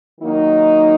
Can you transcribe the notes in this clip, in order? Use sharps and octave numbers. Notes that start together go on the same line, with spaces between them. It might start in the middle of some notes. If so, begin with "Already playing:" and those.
D#3 F#3 A#3 D#4